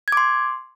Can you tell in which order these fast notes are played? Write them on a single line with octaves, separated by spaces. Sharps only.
G#6 D6 C6